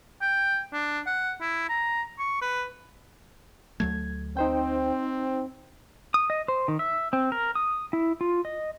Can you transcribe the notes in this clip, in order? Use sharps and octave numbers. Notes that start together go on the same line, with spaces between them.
G5
D4
F#5
E4
A#5
C#6
B4
D2 F#3 A3 G#6
C4 D#4 C5 G5
D#6
D#5
C5
D#3
E5
C4
A#4
D#6
E4
F4
D#5